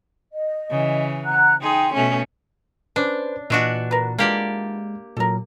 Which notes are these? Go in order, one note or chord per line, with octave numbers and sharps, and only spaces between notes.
D#5
C#3 E3
F#5 A#5 F#6
D#4 G#4 G5 C6
B2 A3 C#4 G#5
C#4 D4 B4 C5 D6
A#2 E3 D4 F#4 D#5 C#6
A#4 B4
D3 E3 G#3 A#3 F4 G4 D5
A#2 F#3 A4 A#4